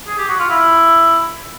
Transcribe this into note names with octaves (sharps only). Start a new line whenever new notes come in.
G#4
G4
F#4
F4
E4